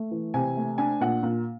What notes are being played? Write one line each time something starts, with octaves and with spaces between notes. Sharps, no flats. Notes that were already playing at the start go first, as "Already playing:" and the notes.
Already playing: A3
E3
C3 G#5
A3
D4 G#5
A#2 F#5
A#2